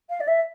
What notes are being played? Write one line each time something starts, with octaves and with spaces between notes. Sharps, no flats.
F5
D5
E5